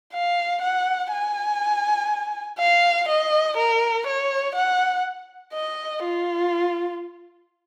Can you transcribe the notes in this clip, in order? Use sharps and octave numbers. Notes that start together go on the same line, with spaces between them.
F5
F#5
G#5
F5
D#5
A#4
C#5
F#5
D#5
F4